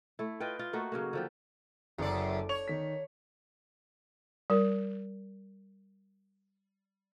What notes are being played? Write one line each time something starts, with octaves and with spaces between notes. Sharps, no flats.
A3 E4
F4 B4 D#5 G5
F4
A3 A#3 D#4 F#4
C#3 F#3 A#3
D3 F3 G4
F#1 F#2 A4 D5
C#5 F7
D#3 B6
G3 A#4